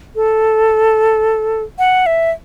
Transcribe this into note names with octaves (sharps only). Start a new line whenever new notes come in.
A4
F#5
E5